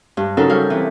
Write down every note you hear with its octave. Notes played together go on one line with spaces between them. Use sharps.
G2
C#3 F#3 C#4 D#4 A4 A#4
G3 C#5 F5 G6
C3 E3